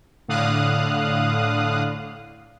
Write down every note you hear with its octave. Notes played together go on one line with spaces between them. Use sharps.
A2 D3 F5 D#6 F#6